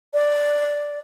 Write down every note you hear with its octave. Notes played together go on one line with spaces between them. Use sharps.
D5